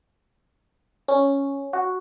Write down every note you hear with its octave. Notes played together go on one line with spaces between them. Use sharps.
C#4
F#4